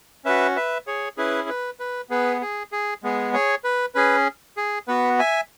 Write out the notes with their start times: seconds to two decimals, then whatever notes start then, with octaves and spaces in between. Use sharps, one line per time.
0.25 C#4 F#4 B4 E5
0.56 B4 E5
0.87 G#4 C#5
1.17 C#4 E4 G#4 B4
1.49 B4
1.80 B4
2.10 B3 G#4 B4
2.42 G#4
2.72 G#4
3.03 G#3 B3 G#4
3.33 G#4 C#5
3.64 B4
3.95 C#4 G#4 B4
4.57 G#4
4.88 B3 F#4 B4
5.19 E5 G#5